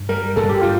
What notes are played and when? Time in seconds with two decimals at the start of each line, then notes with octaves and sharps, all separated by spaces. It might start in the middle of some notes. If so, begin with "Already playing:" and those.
Already playing: G2
0.09 G3 A#4
0.36 G2 A4
0.49 G4
0.61 G3 F4